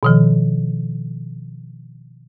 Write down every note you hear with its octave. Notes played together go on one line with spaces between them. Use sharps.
B2 D#3 F3